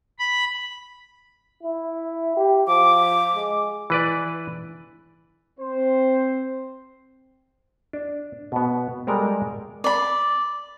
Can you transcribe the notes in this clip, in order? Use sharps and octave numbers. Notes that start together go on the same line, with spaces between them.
B5
E4
G4
F3 D6
G#3
E3 B4 D5
C4 C5
D4
B2 B3
G3 G#3 A4 A#4 D5
D5 B5